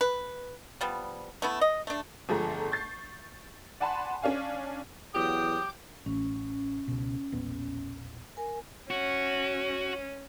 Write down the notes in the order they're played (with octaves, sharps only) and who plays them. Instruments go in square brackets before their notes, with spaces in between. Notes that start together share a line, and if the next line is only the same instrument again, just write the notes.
[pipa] B4
F3 G3 B3
A3 B3 E4
D#5
A3 D4
[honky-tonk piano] G1 F3 G#3 A3 G#4 A#5
C#6 G6 A6 C7
D5 F#5 G#5 A5 B5 C6
C#4 D4 F5 G#5
[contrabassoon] E2 [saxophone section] F#3 G4 [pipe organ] D6 G6 [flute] D#6
[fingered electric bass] A1 [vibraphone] C#4
[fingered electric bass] C#2 B2
E1 A#1 B3
[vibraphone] A#4 G#5
[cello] C#4 [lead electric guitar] F#4